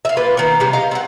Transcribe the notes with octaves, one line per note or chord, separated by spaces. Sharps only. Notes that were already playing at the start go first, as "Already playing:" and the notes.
E5 F5
A#3 F4 B4
D#3 A#3 B3
C3 E3 G3 C#4
D#5 F5 A#5
C4 F#5